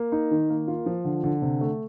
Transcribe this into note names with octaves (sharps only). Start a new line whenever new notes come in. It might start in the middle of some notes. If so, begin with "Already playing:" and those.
Already playing: A#3
D#4
D#3
A#3
F4
F3
D3
D3
C3
A3